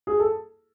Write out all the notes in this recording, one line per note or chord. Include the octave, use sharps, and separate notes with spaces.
G#4
A4